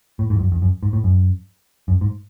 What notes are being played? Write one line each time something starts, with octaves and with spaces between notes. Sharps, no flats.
A2
G#2
E2
F#2
E2
F#2
G#2
A2
F#2
F#2
G#2